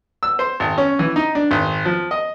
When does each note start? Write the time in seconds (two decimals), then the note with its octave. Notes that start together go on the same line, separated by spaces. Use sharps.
0.23 E6
0.39 C5
0.60 G#1
0.78 C#4
0.99 E3
1.16 D#4
1.35 D4
1.51 G#1
1.85 F3
2.11 D#5